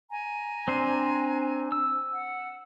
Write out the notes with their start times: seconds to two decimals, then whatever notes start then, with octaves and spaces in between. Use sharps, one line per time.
0.09 G#5 A#5
0.68 C4 D4 C5
1.72 E6
2.13 F#5